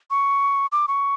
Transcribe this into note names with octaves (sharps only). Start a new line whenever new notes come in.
C#6
D6
C#6